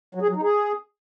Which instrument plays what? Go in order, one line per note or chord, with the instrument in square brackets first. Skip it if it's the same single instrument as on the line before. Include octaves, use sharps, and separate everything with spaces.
[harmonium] F#3
G#4
F#3
D#4
G#4